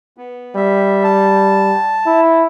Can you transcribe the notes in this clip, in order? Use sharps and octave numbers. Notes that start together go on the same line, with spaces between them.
B3
G3 E5
A5
E4